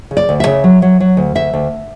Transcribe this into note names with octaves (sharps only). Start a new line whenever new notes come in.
C#3
D5
D2
E5
C#3
F#3
F#3
F#3
D2
D2 E5
D2